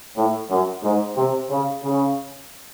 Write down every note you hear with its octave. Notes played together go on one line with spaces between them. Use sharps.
A2
F#2
G#2
C3
C#3
C#3